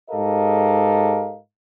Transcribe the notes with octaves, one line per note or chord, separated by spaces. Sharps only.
G#2 G4 A4 A#4 D#5 F5